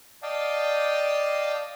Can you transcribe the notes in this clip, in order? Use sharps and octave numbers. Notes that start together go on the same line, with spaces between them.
D5 D#5 F5 G5 A5